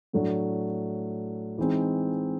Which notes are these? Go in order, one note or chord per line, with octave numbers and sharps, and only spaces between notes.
A2 F#3 A3 D4
E3 G#3 C4 D#4